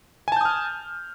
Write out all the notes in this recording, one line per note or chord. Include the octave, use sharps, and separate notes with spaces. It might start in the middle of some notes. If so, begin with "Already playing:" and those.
G#5 A5 D#6 F6 G6